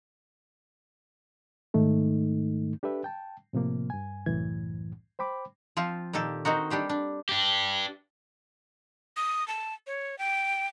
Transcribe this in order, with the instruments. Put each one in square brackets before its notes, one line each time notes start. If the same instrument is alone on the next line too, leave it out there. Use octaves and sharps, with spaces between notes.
[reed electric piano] G#2 D#3 A3 D#4
D4 G4 A4 B4 E5
G5 A5
A2 C3 F3 A#3
G2 G#5
C2 F#2 A2 E3 G#6
C5 G5 B5 D6
[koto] F3 C4 F4
A#2 D#3 G4 A4
D#3 C4 D#4 F#4
G3 D4 G4 C5
D4
[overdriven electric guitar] D4 G4
[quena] D#6
A5
C#5
G5